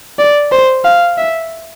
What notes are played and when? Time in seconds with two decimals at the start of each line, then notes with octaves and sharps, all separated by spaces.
0.19 D5
0.52 C5
0.84 F5
1.18 E5